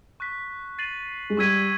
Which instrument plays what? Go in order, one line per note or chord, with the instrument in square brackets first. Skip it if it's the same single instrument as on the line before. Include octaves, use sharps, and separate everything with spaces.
[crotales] C#6 F#6 B6
A6 C7 D#7 F#7
[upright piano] G#3
[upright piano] G3 [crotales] C#6 E6 G#6 B6 D#7